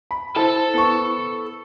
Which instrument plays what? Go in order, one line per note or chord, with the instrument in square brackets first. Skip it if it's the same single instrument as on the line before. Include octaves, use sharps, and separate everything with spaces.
[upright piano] B5
[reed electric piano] E4 C5 [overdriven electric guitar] A4 A5
[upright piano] B3 C#6